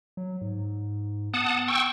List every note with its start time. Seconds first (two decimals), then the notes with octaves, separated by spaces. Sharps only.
0.17 F#3
0.41 G#2
1.34 B3 F#5 A5 D#6
1.68 G5 C#6 E6